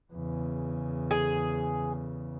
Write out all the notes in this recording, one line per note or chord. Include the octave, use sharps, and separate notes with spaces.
E2 C#3
G#4